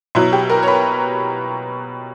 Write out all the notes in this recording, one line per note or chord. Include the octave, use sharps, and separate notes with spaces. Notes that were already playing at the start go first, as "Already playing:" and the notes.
B2 F#3 E4
G4
A#4
C#5
B4